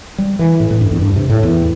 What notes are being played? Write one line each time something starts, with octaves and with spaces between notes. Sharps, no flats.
G3
E3
A2
A2
G2
E2
G2
C3
A2
E2